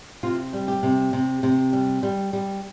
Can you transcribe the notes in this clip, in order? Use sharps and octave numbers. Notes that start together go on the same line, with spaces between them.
C3 F4
G3
G4
C3
C3
C3
G3
G3
G3